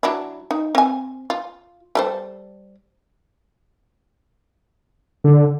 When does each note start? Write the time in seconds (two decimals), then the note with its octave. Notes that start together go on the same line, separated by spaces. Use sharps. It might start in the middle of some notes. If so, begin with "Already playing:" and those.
0.03 F#3 D4 E4
0.51 D#4
0.75 C4 G#5
1.30 F4
1.95 G3 A4 C5
5.24 D3